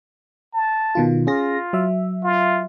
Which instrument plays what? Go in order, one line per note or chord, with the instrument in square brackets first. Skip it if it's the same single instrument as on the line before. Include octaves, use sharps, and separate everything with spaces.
[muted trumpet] A5
[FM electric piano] B2 D#3 F4
[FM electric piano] C#4 G#4 A#6 [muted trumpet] F4
[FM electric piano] F#3 E5
[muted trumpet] F4